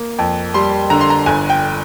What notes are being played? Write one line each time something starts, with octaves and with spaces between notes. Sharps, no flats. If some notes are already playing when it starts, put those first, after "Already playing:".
Already playing: A#3
F2
G3 C6
D3 A#5
C6
A#5
G1 G#5
G5